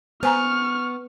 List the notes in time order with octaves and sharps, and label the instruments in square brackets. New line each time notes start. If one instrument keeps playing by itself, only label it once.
[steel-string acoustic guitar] B3 [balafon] C5 G#5 A#5 [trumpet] C#6 [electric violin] F6